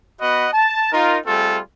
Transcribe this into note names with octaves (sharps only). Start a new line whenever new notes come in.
B3 F#4 D#5 F#5 B5
A5
D#4 F4 A#4
G3 A3 C4 F4 G#4 A4